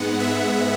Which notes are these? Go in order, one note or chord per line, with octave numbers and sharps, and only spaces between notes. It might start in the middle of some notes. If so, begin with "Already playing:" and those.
Already playing: G#2 G#3 B3 F#5
E5